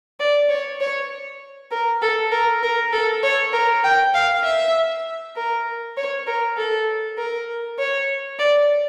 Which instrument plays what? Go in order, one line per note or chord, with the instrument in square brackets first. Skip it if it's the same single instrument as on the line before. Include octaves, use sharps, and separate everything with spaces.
[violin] D5
C#5
C#5
A#4
A4
A#4
A#4
A4
C#5
A#4
G5
F5
E5
A#4
C#5
A#4
A4
A#4
C#5
D5